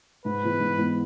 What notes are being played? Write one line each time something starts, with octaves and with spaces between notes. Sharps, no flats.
G#2 B4
E3 G#3 B3
G#2
E3 G#3 B3